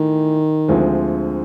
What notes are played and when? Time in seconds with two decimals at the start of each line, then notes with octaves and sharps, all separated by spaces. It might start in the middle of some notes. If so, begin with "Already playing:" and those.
Already playing: A2 D#3 E3
0.68 D2 D3 F3 G#3 C4